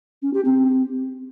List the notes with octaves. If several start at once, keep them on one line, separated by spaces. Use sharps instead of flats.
C#4
G4
C4